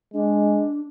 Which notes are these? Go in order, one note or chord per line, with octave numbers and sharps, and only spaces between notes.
G#3 D4